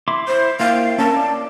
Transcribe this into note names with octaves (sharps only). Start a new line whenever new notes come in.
E4 C6 D6
E4 C5
A#3 E4 F5 G5
C#4 A#4 A5
D5